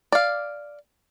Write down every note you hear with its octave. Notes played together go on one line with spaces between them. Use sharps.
D5 F5